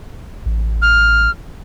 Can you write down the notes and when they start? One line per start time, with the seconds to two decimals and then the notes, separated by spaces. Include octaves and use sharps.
0.46 A1
0.82 F6